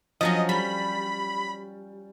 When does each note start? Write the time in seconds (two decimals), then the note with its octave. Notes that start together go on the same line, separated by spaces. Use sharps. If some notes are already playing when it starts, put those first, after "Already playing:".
0.21 F3 F#3 C#4 D#5
0.49 G3 B5